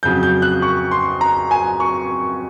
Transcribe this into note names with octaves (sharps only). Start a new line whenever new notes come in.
F2 C#3 F#3 G6
G6
F#6
C#6
C6
A#5
G#5
C#6